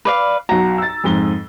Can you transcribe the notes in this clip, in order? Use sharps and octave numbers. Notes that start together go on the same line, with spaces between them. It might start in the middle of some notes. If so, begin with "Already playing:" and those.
B4 D5 F5
B1 F#4 A#5
E6 A6
F2 G#2 G7